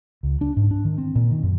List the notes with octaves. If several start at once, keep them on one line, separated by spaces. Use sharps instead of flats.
C#2
D4
G#2
D4
D#3
C4
A#2
D#3
F#2